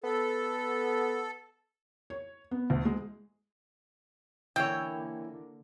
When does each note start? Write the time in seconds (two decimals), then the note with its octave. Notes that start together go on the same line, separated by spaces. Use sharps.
0.04 B3 A4
2.10 C#5
2.51 B3
2.70 D2
2.85 G#3
4.56 D3 E3 A#3 E4 C#5 G5